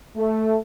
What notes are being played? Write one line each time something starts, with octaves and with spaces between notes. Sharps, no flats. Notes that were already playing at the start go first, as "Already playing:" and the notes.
A3